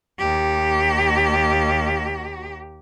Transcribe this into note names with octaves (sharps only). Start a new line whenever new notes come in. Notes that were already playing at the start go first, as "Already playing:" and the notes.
D#2 G4